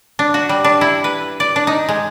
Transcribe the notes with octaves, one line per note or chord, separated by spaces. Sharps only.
D4
F#4
G3
D4
E4
B4
D5
D4
D#4
G#3